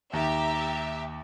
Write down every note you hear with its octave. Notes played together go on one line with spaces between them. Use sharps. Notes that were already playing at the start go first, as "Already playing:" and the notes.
D#2 G4 E5 A#5